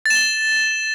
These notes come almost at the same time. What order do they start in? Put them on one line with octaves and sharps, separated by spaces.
A6 E7 G7